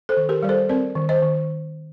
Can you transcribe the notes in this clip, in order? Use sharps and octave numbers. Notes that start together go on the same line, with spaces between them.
A4 C5
D#3
G4 A#4
G3 D5
A4 C5
C4 A#4 D5
D#3
C5 D#5
D#3